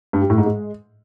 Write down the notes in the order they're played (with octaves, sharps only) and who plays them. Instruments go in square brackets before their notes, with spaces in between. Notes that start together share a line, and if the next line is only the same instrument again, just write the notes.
[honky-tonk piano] G2
G3
A2
G#2
G#3